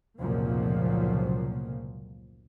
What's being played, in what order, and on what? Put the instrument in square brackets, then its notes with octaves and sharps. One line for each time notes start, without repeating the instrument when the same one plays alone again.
[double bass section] F1 C#2 A#2 F3 F#3 A#3